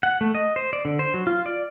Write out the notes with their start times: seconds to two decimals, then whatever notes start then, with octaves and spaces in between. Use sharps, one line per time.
0.03 F#5
0.21 A3
0.35 D#5
0.56 C5
0.73 D5
0.85 D3
0.99 C5
1.14 F#3
1.27 F4
1.46 D5